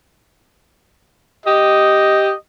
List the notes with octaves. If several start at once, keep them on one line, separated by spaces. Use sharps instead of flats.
G4 D#5